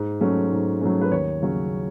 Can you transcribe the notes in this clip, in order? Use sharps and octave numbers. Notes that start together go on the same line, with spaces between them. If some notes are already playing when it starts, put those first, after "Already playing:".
Already playing: G#2
F#3 A3 C#4
G#2
F#3 A3 C#4
B4
D#2 C#5
C#3 F#3 C#4